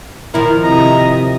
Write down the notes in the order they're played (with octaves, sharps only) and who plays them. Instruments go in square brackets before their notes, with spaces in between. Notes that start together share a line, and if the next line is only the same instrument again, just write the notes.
[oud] D#3 F3 E4 [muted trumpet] A#4
[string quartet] C3 D#5 E5 [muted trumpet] A#5